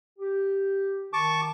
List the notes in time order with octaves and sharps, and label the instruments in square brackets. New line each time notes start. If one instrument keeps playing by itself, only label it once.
[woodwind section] G4
[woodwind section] D#3 [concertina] A5 C#6 D6